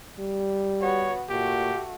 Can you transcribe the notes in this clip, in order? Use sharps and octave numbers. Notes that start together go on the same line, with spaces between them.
G3
B3 F#4 C#5
A#2 A3 F#4 G4